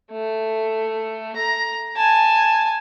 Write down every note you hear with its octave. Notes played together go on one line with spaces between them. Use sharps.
A3
A#5
G#5 A5